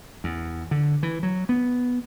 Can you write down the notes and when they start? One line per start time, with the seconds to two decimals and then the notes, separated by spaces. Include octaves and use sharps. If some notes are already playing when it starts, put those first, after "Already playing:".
0.24 E2
0.71 D3
1.03 E3
1.23 F#3
1.49 B3